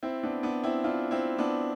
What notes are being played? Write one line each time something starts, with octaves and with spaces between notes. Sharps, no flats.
C4 E4
B3 D4
B3 D4
C4 E4
D4 F4
C4 E4
B3 D4